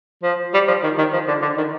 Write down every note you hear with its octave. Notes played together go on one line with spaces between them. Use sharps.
F3
G3
F3
D#3
D#3
F3
D3
D3
D#3